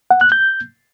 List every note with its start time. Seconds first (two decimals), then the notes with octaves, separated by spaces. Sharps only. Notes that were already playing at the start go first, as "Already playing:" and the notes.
0.11 F#5
0.21 F#6
0.32 G6